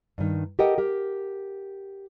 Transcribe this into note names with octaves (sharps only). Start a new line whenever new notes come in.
G2 D#3
G4 A4 A#4 D#5 F#5 G5
G4 A#4